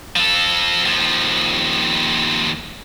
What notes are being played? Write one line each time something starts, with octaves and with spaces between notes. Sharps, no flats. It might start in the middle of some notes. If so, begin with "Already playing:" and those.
F3 A4
D#2 F3